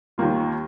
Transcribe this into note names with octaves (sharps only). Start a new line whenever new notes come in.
D#2 D#3 A#3 F4